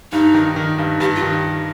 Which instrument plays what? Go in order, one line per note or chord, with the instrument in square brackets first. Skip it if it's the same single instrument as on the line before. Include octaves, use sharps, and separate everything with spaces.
[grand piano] G2 [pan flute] D#4
[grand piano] D#3
D#3
G2
[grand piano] G2 [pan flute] G4
[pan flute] F4
[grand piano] D#3